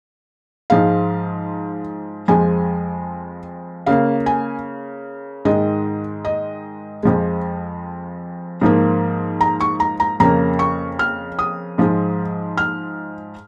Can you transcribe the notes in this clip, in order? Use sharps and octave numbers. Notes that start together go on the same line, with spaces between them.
G#2 F3 G#3 F5
F2 F3 G#3 G#5
C#3 A#3 F5
G#5
G#2 D#3 G#3 D#5
D#5
F2 F3 G#3
G#2 F3 A#3
A#5
C#6
A#5
A#5
F2 C#3 A#3 A#5
C#6
F6
D#6
G#2 F3 G#3
F6